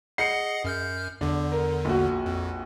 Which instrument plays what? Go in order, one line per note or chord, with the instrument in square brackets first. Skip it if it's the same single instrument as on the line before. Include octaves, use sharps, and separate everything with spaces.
[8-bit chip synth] G#4 D#5 F#5 [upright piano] C7 C#7
[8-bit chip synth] F#2 F6 G6
[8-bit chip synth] E2 D3 [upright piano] D4
[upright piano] A#4
A#1 F#4
[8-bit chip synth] F2